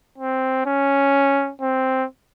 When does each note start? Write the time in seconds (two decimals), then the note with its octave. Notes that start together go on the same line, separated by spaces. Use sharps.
0.18 C4
0.66 C#4
1.61 C4